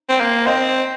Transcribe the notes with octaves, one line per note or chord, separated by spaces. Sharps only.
C4
A#3
C4 C5 D#5